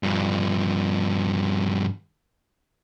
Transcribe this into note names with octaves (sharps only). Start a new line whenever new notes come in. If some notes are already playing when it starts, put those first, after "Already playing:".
G2 F3